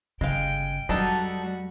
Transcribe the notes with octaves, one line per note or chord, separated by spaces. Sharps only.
G1 C#3 G#3 F5 G5
F2 F#3 G3 D4 D#4 F#4 A4